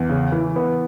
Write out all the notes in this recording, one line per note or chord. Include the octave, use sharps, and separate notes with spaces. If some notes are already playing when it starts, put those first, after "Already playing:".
Already playing: E2
C#3
E3
B3